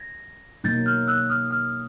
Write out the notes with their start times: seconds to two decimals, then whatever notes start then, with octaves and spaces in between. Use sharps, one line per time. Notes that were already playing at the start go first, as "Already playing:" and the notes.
Already playing: G#6 A#6
0.64 B2 F#3 A#3 D#4 G6 A6
0.86 F6 G6
1.07 E6 F#6
1.30 D#6 F6
1.51 D#6 F6